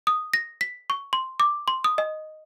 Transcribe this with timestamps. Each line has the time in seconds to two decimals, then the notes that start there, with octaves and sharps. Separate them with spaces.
0.07 D#6
0.33 A#6
0.61 B6
0.90 C#6
1.13 C6
1.40 D6
1.68 C6
1.84 D#6
1.98 D#5